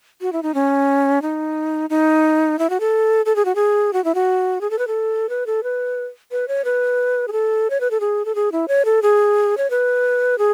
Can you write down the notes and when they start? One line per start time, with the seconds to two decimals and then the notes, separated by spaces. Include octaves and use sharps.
0.21 F#4
0.33 E4
0.43 D#4
0.54 C#4
1.22 D#4
1.90 D#4
2.59 E4
2.70 F#4
2.80 A4
3.26 A4
3.36 G#4
3.45 F#4
3.55 G#4
3.93 F#4
4.04 E4
4.15 F#4
4.61 G#4
4.71 A4
4.79 B4
4.87 A4
5.29 B4
5.46 A4
5.63 B4
6.31 B4
6.48 C#5
6.65 B4
7.28 G#4
7.32 A4
7.70 C#5
7.81 B4
7.91 A4
8.00 G#4
8.25 A4
8.35 G#4
8.52 E4
8.68 C#5
8.85 A4
9.02 G#4
9.57 C#5
9.70 B4
10.38 G#4